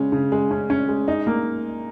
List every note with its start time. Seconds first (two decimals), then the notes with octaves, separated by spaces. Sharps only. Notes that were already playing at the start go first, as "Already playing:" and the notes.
Already playing: C#3 G#3 C#4
0.12 C#3
0.32 G#3
0.51 C#4
0.70 C#4
0.88 G#3
1.08 D#4
1.27 A#3